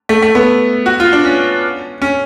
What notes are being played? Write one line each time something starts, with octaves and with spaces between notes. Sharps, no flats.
A3
A3
B3
F#4
F4
D4
C#4
C#4